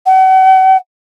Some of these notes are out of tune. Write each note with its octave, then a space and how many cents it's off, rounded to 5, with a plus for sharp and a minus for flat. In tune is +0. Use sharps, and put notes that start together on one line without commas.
F#5 +40